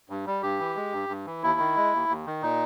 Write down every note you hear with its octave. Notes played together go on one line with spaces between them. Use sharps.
G2
G3
G2 G4
E3
G#3
G2
G2
E3
D#2 E4
D#3
G#3
D#2
D#2
D#3
A#2 D#4